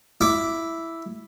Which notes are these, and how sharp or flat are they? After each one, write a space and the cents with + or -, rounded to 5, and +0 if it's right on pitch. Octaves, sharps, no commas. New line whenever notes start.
E4 +0 D6 +0